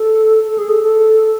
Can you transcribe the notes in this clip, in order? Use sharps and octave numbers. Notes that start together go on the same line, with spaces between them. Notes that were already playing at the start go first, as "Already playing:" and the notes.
Already playing: A4
A4
G#4
A4
A4